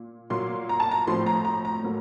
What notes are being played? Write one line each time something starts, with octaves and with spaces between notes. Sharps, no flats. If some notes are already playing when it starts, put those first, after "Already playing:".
Already playing: A#2
A#2 F#3 A#3 C6
A#5
A5
A#5
A2 F3 C4 C6
A#5
A#5
A#5
A2 F#3 A#3